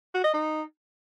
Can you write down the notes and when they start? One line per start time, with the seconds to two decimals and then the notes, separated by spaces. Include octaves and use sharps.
0.14 F#4
0.24 D#5
0.34 D#4